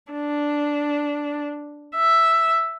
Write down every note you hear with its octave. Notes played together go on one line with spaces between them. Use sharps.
D4
E5